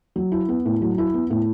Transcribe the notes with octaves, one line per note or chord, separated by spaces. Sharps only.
F#3
E4
B3
A2
F#3
E4
B3
A2